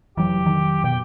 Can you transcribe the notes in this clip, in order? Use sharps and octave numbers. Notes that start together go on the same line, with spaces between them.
F1 E3 F#3 G4
D#3
B2 G5